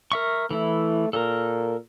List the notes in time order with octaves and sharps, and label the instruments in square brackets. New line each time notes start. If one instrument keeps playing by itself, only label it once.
[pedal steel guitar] A#4 E5 C#6
[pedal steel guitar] E3 E4 [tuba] A3
[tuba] A#2 [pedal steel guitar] A4 A#4